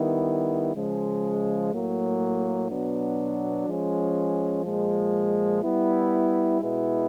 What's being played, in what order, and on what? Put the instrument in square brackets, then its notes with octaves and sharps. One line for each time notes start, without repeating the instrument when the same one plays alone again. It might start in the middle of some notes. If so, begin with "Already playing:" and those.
Already playing: [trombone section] D#3 G3 B3 E4
C#3 F3 G#3
A2 F#3 A#3
B2 F#3 B3 D4
F3 G#3 C#4
A#2 F3 G#3
G3 B3 E4
B2 G#3 B3 E4